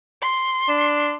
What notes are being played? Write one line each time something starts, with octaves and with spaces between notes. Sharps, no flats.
C6
D4